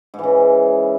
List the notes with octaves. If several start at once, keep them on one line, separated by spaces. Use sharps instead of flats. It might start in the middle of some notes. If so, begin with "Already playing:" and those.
G#2 C#3 E3